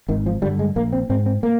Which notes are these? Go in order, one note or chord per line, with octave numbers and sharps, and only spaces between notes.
G#1 D#3
F3
G2 D3 G3
G#3
A#1 A#3
C4
G#2 C4
C4
A#3